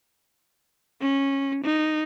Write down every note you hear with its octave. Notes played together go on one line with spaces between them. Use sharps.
C#4
D#4